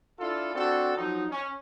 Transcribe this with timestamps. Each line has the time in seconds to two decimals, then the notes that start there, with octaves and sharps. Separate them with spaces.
0.19 D4 E4 F4 A4
0.54 C4 D4 F#4 A4
0.97 F3 F#3 D#4
1.31 C#4